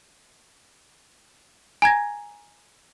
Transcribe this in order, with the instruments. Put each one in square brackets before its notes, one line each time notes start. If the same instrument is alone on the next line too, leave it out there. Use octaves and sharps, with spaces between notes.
[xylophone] G#5 A#5 G#6 A#6